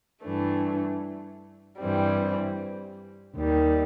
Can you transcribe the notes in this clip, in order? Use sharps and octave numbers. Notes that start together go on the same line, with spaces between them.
G2 E3 A3 D4
G2 E3 G3 C4
D#2 D#3 G3